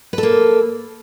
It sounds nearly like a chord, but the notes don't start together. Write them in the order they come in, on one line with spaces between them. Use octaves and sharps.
B4 A4 A#3